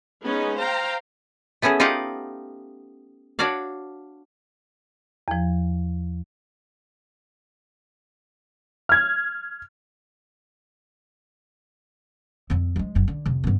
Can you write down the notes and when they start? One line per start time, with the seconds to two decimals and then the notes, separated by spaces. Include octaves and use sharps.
0.23 G#3 B3 C#4 D#4
0.59 C5 F5 G5 A#5
1.62 A3 B3 C#4 E4 G#4
1.80 D#4 F4 G4 F5 F#5
3.39 D4 F#4 C#5 D5 F5
5.28 E2 F3
8.89 F6 G#6
12.50 F2 C4
12.76 F3 G#3
12.95 F#1 F#2
13.08 D3
13.26 F2 C3
13.44 G2 B3